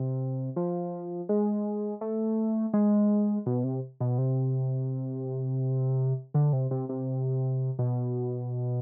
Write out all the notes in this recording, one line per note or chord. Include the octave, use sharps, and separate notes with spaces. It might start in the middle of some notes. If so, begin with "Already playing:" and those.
Already playing: C3
F3
G#3
A3
G#3
B2
C3
B2
C3
D3
C3
C3
C3
B2